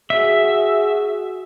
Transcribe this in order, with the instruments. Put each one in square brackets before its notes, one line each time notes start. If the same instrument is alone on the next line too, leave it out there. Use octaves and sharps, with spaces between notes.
[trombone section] F#4 G#4 [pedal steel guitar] E5